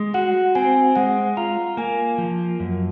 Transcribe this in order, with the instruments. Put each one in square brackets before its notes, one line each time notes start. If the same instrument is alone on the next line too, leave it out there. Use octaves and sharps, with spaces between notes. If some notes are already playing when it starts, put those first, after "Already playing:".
Already playing: [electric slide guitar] G#3
[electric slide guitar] F#4 [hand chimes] F#5
[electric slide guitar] C4 [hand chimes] G#5
[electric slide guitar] G#3 [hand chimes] F#5
[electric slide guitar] F4 [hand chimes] A#5
[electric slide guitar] A#3 [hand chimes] G#5
[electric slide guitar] F3
F#2